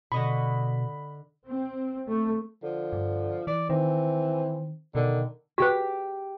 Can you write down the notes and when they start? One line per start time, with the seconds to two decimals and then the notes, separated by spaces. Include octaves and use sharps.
0.12 B2 D3 D#5 B5 C#6
1.47 C4
2.09 A3
2.63 D3 F3
2.93 G2
3.47 E3 D5
3.70 D#3 E3 C4
4.95 B2 D3 D#3
5.58 F#4 G4 B4 B6